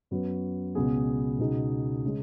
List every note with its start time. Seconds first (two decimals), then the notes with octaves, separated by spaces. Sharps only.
0.11 F#2 F#3 B3 F#4 B4
0.75 C#2 B2 B3 G#4
1.39 C#2 B2 B3 D#4 G#4
2.05 C#3 G#3